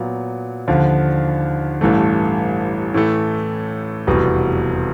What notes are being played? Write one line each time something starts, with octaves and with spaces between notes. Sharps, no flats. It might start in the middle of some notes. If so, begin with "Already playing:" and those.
Already playing: A#2 F#3 B3
D#2 D3 F3
A1 G2 E3 A3
A2 E3 A3
F1 E2 B2 G3